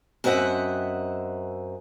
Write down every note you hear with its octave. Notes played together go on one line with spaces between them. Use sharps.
F#2 C4 D#5 E5 F#5